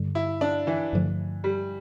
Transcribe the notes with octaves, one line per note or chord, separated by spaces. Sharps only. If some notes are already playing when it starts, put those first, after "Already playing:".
Already playing: G2 D3 G3
E4
D4
E3
G2 D3 F3 A3
G3